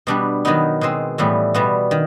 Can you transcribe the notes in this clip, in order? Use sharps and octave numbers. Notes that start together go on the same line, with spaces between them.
B2 G3 B3 D4
D#3 F#3 B3 D#4
B2 G#3 C4
A2 E3 G3 B3
B2 G3 B3
D#3